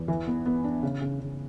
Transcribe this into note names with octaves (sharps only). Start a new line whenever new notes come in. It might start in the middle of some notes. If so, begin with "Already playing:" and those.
Already playing: E2
E3
B3
B3
D4
C#3
C#3
C#3